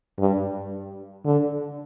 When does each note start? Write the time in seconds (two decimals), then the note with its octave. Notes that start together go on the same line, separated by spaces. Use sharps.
0.19 G2
1.25 D3